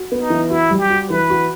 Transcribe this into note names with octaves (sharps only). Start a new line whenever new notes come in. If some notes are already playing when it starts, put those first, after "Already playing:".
Already playing: F#4
B3
D#4
E3
E4 F#4
G3
G4
F#4
E3 B4
F#4